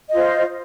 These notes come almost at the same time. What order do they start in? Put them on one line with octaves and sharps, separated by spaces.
D#5 F4 C5